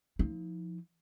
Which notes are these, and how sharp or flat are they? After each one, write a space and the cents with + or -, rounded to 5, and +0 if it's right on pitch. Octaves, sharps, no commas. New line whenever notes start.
F3 +0 D#4 +45